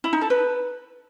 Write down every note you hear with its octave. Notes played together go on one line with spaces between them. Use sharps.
E4
D#4
A4
B4